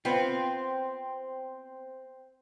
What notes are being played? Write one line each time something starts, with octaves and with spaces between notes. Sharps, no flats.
B3 C4 F4